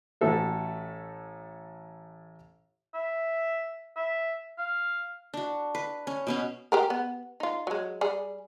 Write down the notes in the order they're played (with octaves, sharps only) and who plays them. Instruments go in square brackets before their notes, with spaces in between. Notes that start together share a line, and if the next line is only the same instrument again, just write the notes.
[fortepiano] A1 A2 F#4 A4 E5
[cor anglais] E5
E5
F5
[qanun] D4 F#4
B4
C#4
B2 B3 C#4
[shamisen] G4 G#4 A#4
B3
D#4 F4
F#3 G#3
G3 G#4